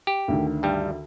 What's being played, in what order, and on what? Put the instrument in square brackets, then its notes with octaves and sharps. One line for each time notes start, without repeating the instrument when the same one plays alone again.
[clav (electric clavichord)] G4
[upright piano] D2 D3 D#3
[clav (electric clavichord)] G2 G3